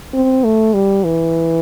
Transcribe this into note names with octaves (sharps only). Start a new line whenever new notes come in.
C4
A3
G3
E3